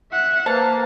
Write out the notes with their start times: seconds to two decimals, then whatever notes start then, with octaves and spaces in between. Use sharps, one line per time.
0.12 E5 F#5
0.46 A#3 B4 C5 A5